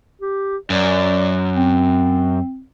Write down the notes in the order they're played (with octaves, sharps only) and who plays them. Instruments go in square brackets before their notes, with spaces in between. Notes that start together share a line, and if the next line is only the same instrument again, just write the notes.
[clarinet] G4
[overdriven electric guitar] F#2 [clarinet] D5
[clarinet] C4